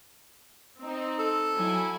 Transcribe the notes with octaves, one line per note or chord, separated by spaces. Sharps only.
C4 D#4
A4
F#3 E4 G#5